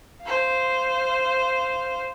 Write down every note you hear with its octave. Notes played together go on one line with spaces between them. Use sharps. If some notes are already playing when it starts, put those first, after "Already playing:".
C5 F5